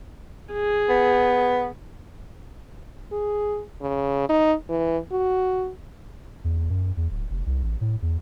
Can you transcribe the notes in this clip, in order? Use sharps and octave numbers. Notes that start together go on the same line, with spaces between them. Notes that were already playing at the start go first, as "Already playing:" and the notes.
G#4
B3
G#4
C#3
D#4
E3
F#4
E2
F#2
E2
D1
F1
C2
A1
A2
E2